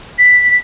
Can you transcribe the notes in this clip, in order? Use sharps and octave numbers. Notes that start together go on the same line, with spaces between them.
B6